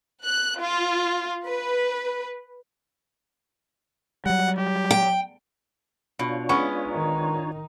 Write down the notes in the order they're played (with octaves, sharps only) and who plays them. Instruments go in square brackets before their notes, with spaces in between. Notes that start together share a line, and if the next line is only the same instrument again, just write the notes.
[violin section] F#6
F4
B4
[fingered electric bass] F#3 G3 [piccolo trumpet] F#5
[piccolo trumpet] G4
[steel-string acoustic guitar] G5
[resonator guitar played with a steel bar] B2 [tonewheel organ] D4 F4 C#5
[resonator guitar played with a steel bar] G#3 B3 C#4 [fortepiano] C#6
[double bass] D#3 D#4